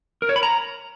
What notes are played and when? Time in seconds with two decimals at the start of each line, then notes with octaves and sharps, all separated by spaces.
0.22 A#4
0.29 C#5
0.36 B5
0.43 A#5